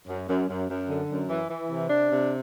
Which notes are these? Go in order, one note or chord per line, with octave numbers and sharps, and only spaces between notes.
F#2
F#2
F#2
F#2
D3
F#2
E3
E3
C3
D4
C3